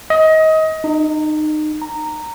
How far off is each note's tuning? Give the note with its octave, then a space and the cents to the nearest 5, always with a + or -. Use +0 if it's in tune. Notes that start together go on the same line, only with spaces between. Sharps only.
D#5 +25
D#4 -25
A#5 -15